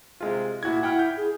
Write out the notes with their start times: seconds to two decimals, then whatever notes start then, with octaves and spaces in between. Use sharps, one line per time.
0.20 C3 G#3 F4
0.63 A#2 E4 F#4 G#6
0.83 E4 F#5 G5 F6
0.99 G6
1.16 G#4